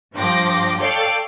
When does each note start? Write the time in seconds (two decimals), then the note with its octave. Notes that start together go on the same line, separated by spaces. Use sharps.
0.14 G2 F3 G5 D6 A#6
0.80 A4 C#5 D5 F5 G5